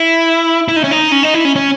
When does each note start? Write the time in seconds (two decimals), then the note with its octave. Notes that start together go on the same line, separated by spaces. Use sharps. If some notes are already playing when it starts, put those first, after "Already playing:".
Already playing: E4
0.68 E4
0.76 D#4
0.84 C#4
0.91 D#4
1.12 C#4
1.23 D#4
1.34 E4
1.45 C#4
1.56 C#4